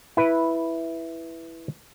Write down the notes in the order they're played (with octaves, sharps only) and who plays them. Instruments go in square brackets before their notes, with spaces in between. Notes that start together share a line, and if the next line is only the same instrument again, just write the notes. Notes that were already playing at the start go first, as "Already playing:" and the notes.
[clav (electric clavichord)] E4 B4